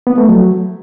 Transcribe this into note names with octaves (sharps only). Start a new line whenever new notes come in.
B3
A3
F#3